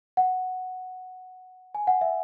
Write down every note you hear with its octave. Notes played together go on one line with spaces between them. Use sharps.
F#5
G#5
F#5
E5